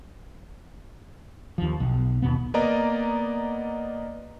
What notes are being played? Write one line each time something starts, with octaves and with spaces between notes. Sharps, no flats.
D#2 F3
B1
D#2 B2 B3
A#3 B3 D5 D#5 A#5